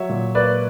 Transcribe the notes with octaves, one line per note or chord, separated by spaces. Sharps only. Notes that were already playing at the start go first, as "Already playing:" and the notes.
Already playing: F#3 C#5 E5
A#2
A#3 B4 D5